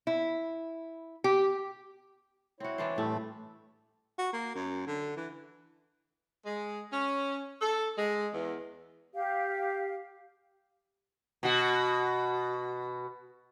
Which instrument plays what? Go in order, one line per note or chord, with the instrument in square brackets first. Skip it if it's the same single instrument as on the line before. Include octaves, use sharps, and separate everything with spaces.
[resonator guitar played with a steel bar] E4
G4
[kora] C4 F#4 [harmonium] E4 C#5
[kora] E3 D4 C5
[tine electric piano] A2 [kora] G3 [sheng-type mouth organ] A3
[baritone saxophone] F#4
A#3
F#2
D3
E3
[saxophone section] G#3
C#4
A4
G#3
E2
[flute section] G4 F5
[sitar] B2 F#4